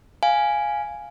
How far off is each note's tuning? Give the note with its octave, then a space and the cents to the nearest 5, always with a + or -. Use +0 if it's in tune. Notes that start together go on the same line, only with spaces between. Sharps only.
F5 +0 G#5 +0